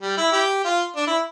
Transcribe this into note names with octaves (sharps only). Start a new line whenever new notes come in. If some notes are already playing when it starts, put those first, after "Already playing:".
G3
E4
E4 G4
F4
D4
E4